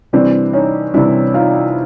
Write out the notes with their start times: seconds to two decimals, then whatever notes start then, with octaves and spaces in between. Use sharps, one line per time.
0.13 C3 E3 G3 C4 D4
0.53 C#4 D#4
0.94 C3 E3 G3 D4 E4
1.34 D#4 F4